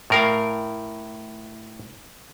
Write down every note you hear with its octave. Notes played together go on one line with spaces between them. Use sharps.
A2 A#4 F5